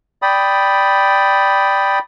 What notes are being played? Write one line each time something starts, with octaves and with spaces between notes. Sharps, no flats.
D5 G5 B5 D#6